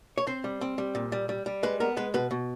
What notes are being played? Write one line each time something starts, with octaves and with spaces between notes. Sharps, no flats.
C#5
C4 C5
G3
C4
G3
A#2
G3
G3
G3
G#3 B4
B3 A#4
G#3 B4
B2 B4
B2